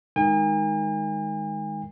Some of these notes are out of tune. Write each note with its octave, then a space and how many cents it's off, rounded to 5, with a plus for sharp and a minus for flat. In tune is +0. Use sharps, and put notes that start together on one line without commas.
D#3 +0 G#3 -5 G#5 -45